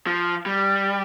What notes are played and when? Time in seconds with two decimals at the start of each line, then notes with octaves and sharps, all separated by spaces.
0.07 F3
0.46 G3